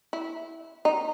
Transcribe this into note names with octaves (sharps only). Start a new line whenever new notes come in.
E4
D#4